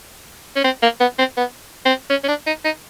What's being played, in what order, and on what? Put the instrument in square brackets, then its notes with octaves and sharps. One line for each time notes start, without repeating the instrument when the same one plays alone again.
[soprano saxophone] C#4
C4
A#3
B3
C4
B3
C4
C#4
C#4
D4
D#4
D#4